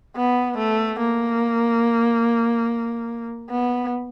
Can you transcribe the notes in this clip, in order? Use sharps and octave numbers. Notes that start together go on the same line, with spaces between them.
B3
A3
A#3
B3